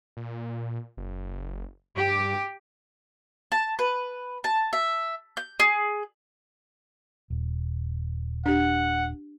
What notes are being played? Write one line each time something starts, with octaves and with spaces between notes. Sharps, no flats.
A#2
F#1
G2 G4
A5
B4
A5
E5
G6
G#4
D#1
D4 G4 F#5